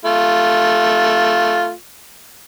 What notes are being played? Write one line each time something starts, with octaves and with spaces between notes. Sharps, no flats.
A3 F4